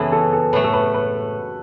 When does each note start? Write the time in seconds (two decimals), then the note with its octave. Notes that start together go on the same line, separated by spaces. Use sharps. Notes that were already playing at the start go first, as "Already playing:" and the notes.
Already playing: F#2 C#3 E3 B3 E4 A4 B4
0.12 A4
0.33 A4
0.53 A2 F#3 A3 B4
0.64 A4
0.73 B4
0.94 B4